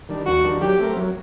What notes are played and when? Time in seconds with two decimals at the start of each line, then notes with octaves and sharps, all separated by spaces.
0.09 D#3 G3 D4
0.26 D#2 F#4
0.44 D#3 G3 D4
0.61 F#3 G4
0.79 A3 C4 G4 A#4
0.97 F#3